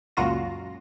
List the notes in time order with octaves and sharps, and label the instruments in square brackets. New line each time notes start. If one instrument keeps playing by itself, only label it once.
[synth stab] C#2 F#2 A#2 F4 F#4 A#6